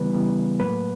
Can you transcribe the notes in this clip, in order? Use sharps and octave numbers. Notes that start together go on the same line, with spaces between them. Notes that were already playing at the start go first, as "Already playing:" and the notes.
Already playing: C#3 E3 G3 B3 B4
C#3 E3 G3 B3
A2 F#3 A#3 B4